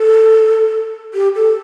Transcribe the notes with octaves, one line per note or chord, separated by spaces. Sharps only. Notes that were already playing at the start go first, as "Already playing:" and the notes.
Already playing: A4
G4
A4